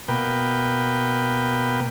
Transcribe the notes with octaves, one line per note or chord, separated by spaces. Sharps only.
B2 A#3 B4 G5